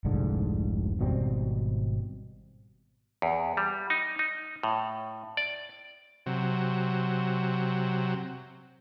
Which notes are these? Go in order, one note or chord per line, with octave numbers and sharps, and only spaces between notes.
F1 C2 G#2 D3
G#1 B2 G3 C4
E2
G3
D#4
D#4
A2
D5
C3 F#3